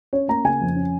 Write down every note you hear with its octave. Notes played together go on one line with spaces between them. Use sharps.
C#4 C#5
A#3 A#5
C#3 G#5
F2
C#4